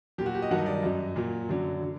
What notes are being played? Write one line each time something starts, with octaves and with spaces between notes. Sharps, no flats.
A#2 F#3 G4
F#4
G4
D#5
G2 D#3 F#3 F#5
D#5
D5
D#5
F#2 F#3
A#2 F#3
F#2 D3 F#3 D5
D3